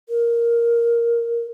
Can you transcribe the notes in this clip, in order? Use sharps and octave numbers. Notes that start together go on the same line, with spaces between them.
A#4